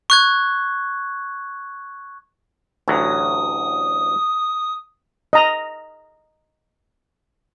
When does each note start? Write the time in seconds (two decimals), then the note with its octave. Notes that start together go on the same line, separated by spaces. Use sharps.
0.10 C#6 F#6 G#6
2.88 A1 D2 F#3 D#6
5.33 D#5 A#5